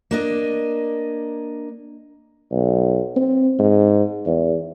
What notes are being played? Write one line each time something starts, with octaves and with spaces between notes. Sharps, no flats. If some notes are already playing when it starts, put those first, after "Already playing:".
A#3 D4 D#5
B1
C4
G#2
E2